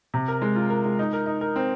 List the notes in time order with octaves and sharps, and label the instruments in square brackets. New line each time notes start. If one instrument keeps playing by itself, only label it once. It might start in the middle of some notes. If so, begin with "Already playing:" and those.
[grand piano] C3
A#4
G#3
F4
A#4
G#3
D#4
A#4
D#4
A#4
C4